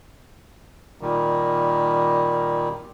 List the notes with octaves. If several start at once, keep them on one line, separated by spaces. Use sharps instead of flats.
A#2 D#3 G3